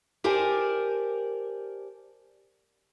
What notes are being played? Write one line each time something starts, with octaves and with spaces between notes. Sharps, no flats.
G4 A#4 C5 D5 G#5 A5